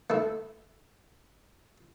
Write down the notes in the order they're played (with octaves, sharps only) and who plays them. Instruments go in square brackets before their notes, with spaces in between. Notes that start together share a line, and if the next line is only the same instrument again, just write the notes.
[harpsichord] A3 E4